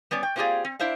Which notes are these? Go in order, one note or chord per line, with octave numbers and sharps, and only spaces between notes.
G3 B3 C#4 D5
G5
A#3 C4 F4 G4 G#4 D5
C4
D4 E4 C5 E5 F5